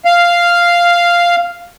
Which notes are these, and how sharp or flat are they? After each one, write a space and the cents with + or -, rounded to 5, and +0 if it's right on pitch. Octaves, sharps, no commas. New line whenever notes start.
F5 -5